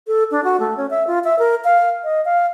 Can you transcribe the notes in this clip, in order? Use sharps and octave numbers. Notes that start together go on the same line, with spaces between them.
A4
D4
F#4
A3
C#4
E5
F4
E5
A#4
F5
D#5
F5